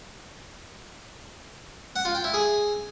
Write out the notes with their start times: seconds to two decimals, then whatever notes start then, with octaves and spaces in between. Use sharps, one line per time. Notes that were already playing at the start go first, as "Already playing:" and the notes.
1.96 F#5
2.05 F4
2.15 G5
2.24 E4
2.34 G#4